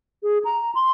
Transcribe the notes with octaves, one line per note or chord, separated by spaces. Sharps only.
G#4
A#5
C6